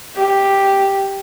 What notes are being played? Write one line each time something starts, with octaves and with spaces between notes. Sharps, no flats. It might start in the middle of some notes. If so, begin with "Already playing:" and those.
G4